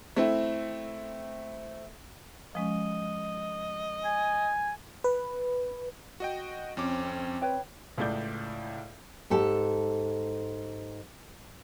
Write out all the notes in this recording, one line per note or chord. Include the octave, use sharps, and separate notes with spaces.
A3 C4 E4
F3 G#3 C#4 D#5
G#5
B4
F#4 D#5 G5
F2 C4 C#4 D6
B4 C#5 G5
C#2 A2 D5 G6
G#2 G4 A4 A5